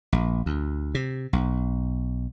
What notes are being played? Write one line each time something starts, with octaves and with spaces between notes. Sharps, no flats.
A#1
D2
C3
B1